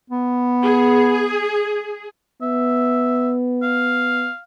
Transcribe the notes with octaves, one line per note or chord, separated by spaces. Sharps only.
B3
G#4
B3 E5
F5